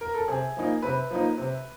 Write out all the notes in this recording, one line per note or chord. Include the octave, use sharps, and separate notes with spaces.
A#4
A4
C3 G#4
F3 A#3 D#4
C3 B4
F3 A#3 D#4
C3